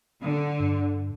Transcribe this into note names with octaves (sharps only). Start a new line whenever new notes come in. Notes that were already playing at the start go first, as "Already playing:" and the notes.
D3
G2